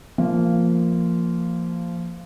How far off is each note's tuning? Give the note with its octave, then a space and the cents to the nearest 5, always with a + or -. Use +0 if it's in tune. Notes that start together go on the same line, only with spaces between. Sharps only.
F3 -15 A#3 -10